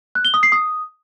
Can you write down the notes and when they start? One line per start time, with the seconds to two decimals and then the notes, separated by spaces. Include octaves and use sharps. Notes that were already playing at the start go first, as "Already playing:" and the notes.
0.15 F#6
0.25 G7
0.34 D#6
0.43 C7
0.52 D#6